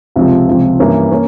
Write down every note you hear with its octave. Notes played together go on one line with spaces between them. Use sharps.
C#2 C3 F3 C4 G4
C#2 C3 F3 C4
G2 E3 A#3 C#4
A#3 C#4